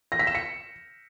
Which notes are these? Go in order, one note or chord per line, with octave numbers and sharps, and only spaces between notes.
A#6
B6
E7
C#7